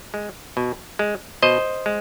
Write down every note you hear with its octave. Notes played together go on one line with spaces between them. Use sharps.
G#3
B2
G#3
B2 C5 D#5
G#3